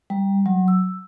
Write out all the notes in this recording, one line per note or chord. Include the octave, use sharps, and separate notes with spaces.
G3
F#3
E6